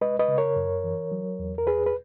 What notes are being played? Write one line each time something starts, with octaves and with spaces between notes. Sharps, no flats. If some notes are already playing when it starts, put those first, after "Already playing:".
G#3 B4 D#5
B4 D#5
C#3
A#4 C#5
F#2
E3
F#3
E2
A#4
E2 G#4 B4
B4